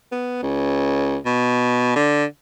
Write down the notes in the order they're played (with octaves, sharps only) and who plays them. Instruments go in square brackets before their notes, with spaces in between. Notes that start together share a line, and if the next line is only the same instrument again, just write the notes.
[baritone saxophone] B3
C#2
B2
D3